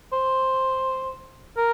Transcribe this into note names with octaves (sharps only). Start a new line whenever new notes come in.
C5
A#4